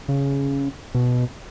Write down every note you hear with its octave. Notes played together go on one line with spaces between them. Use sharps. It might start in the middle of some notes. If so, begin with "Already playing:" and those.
C#3
B2